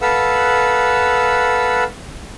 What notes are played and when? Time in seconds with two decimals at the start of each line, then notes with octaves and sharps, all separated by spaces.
0.02 A4 B4 F5 F#5 E6